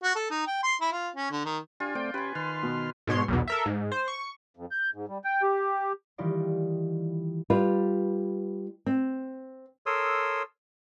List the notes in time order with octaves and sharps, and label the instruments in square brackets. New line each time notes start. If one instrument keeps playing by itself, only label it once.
[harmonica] F#4
A4
D#4
G5
C6
E4
F4
C#4
D3
D#3
[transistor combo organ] D4 G4 G#5 [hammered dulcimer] F4
[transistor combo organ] A3 C4 D5 [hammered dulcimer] G5
[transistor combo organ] C#4 G4 [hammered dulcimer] B4 G#5
[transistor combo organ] D#3 C6 F6 [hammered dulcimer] B4
[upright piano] B2
[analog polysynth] G#2 B2 C#5 C6
B1 E2 B2
A4 A#4 E5
G#2
C5
C#6
[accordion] F2
G6
G#2
G3
G5
G4
[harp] D#3 E3 G3 D#4 F4 D5
[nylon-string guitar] G3 F4 B4
C4
[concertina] A4 A#4 C#5 C6 D#6 E6